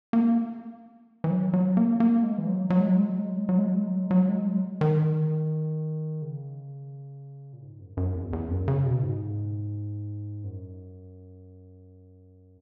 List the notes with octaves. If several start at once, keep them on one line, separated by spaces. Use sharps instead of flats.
A#3
E3
F#3
F#3
A#3
A#3
G#3
E3
F#3
F#3
G#3
F#3
G#3
F#3
G#3
F#3
G#3
F#3
G#3
F#3
G#3
F#3
F#3
G#3
F#3
D#3
C#3
A#2
G#2
F#2
F#2
E2
E2
F#2
C#3
B2
G#2
F#2